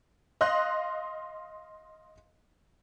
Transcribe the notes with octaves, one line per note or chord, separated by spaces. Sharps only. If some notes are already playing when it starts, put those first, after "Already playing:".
D#5 F5 C6 D#6 F#6